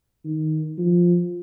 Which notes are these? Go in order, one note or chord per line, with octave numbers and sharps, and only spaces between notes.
D#3
F3